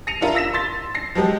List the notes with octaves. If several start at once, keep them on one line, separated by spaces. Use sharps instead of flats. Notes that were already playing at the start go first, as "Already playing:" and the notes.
A#6 C7 C#7 D#7 F7
D4 E4 F4 A#4
E6 A#6 B6 E7
C6 A6 B6
A#6 C7
F3 F#3 G#3 G4